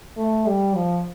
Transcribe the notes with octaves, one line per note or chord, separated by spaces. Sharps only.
A3
G3
F3